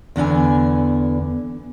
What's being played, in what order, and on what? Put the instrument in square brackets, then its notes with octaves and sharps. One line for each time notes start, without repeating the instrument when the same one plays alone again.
[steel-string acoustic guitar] E2 D3 B3 G#5